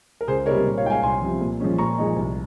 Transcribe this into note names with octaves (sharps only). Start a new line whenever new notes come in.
A#4
C#2 G#4 C5
C3 G3 A#3 D#4 A#4 C#5
A#2
C#5 F5
G#3 D#4 F5 G5 G#5
C2 G#5 C6
C3 F3
A#2
F3 G#3 C#4
A#2 A#5 C#6
F3 G#3 D#4
C2